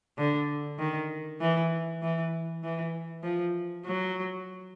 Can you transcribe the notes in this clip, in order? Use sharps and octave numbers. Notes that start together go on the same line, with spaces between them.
D3
D#3
E3
E3
E3
F3
F#3